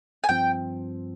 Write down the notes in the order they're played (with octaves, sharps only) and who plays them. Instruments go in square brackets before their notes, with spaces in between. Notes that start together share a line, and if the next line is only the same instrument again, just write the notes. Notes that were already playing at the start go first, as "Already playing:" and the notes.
[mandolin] G#5
[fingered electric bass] G2 F3 C4 [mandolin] G5